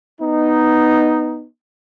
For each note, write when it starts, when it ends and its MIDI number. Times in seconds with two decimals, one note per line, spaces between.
0.20 1.45 59
0.20 1.45 63